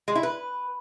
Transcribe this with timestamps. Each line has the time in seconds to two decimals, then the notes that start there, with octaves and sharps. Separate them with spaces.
0.08 G#3
0.15 E4
0.23 B4